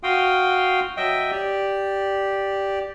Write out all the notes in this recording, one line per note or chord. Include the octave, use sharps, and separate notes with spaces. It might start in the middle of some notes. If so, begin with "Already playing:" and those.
F#4 F5 G5 C6 D#6
F#3 D#5 E5 G5
G4 D5